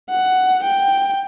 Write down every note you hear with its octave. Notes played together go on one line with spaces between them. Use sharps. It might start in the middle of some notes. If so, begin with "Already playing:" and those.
F#5
G5